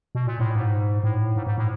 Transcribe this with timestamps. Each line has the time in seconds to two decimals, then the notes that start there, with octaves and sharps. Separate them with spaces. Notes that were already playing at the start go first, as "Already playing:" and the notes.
0.15 B2
0.27 A#2
0.40 A2
0.55 G#2
1.04 A2
1.36 G#2
1.47 G#2
1.58 A2